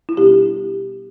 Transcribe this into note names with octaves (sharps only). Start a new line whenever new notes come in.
E4
B2 G3 B3 D4 G4